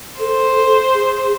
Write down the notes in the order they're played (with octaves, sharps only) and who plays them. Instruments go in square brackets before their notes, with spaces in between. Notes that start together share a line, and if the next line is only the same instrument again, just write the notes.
[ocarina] A4 [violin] C5
[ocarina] G#4